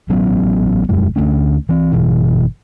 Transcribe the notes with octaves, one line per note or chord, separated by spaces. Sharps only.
A1 F#3 B3 C#4
E1 F#2 G#3
D2 A3 C#4
E3 C4
G1 B2 E3